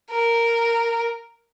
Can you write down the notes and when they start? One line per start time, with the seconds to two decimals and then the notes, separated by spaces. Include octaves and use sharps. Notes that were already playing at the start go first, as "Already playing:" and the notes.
0.11 A#4